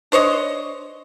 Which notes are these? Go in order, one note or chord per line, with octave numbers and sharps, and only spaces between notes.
D4 C5 C#5 D#5